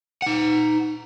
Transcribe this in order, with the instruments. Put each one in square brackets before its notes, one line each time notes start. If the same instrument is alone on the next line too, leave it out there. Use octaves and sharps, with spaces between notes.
[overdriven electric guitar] D#4 F#5